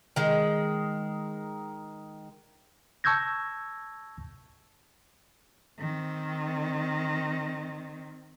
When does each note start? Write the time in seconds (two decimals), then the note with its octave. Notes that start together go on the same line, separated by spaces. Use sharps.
0.16 D#3 G#3
3.04 A5 C#6 E6 G6 G#6 A#6
5.80 D#3 C4